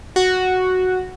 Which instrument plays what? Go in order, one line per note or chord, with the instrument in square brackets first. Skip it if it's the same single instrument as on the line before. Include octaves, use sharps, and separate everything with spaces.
[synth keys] F#4